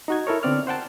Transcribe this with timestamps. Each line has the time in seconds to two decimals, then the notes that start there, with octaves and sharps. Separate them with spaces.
0.08 D#4 F#4 G#6
0.27 E4 A4 A#4 C#5
0.43 D3 B3 C4 D5 F6
0.67 C5 F#5 G5 A5